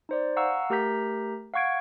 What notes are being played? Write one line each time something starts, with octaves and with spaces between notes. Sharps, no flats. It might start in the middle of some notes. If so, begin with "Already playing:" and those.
D#4 C5 D5
F5 F#5 A#5 C#6 E6
A3 G4 A#4 A#5 G6 B6
F5 F#5 C#6 G#6 D7